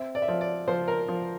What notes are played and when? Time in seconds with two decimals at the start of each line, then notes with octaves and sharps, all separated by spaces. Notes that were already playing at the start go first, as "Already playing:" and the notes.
Already playing: C4 E5
0.15 D5
0.22 E5
0.28 F3 D5
0.41 D5
0.67 F3 C5
0.88 A#4
1.08 F3